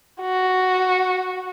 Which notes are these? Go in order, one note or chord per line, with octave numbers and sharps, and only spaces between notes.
F#4